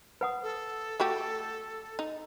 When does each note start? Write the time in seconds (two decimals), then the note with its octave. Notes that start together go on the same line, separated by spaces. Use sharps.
0.21 B4 F#5 D#6
0.43 A4
1.00 A3 F#4 G4
1.99 D#4